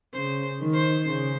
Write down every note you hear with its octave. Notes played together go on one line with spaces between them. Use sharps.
C#3 C5
D#3
C5
C#3 C5